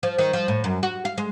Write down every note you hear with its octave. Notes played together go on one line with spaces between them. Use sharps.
F3
D#3
F3
A2
F#2
F#4
F5
G#3